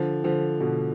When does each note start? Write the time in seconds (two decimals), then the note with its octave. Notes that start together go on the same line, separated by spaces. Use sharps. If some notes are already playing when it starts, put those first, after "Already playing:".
Already playing: D3 F3
0.24 D3 F3
0.60 B2 D3